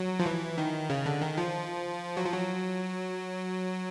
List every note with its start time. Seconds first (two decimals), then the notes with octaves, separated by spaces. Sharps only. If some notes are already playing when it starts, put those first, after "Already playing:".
Already playing: F#3
0.19 F3
0.26 E3
0.58 D#3
0.90 C#3
1.06 D3
1.21 D#3
1.37 F3
2.17 F#3
2.25 F3
2.34 F#3